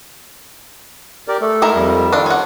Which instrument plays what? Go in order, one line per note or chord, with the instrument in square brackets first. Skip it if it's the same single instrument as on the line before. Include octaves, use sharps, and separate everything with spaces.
[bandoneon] G4 A#4 D5
A3 A4
[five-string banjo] G#3 E4 A#4
[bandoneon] F2 G3
[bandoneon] D#3 A4 [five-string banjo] D4 F4
[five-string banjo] C#4 F#5